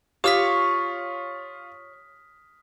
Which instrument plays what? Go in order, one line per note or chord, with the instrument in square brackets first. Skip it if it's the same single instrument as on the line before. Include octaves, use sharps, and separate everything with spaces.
[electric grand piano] F4 F5 [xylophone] G4 [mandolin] C#5 [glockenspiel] D#6 F6 B6